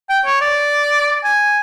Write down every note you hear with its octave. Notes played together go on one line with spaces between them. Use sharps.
G5
C#5
D5
G#5